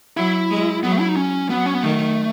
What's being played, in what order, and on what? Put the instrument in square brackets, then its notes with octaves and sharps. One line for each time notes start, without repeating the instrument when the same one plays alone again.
[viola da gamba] F#3 [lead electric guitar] E4
[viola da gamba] G#3
[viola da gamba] F#3 [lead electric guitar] B3
[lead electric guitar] A3
E4
D#4
C#4
[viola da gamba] F#3 [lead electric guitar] B3
[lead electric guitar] C#4
B3
[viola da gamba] D#3 [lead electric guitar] A3